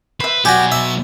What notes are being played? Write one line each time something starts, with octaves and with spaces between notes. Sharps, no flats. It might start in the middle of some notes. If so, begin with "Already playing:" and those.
B4 C5 E5
B2 F#3 F#4 G4 D5 G#5
E5